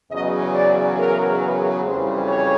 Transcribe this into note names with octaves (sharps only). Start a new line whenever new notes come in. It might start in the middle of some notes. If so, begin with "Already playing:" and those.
E2 C#3 F#3 D#5
D5
A#4
B4
F2 C#3 E3 G3 C5
C#5